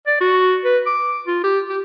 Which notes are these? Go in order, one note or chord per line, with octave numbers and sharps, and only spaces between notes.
D5
F#4
B4
D6
F4
G4
G4